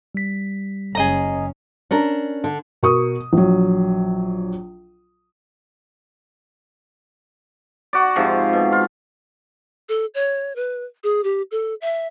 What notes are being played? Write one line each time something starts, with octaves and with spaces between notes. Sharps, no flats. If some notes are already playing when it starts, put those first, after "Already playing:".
G3 B6
F#1 C#4 G#4 D#5 A#5
C#4 D4 A#4
D3
B2 A#4 C#6 D#6
A#1 F#3
F#4 D5
G#2 C3 F3
B2
F4
A4
C#5
B4
G#4
G4
A4
E5